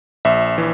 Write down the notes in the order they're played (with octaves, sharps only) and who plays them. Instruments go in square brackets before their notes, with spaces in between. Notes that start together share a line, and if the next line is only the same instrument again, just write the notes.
[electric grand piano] A#1 E5
E3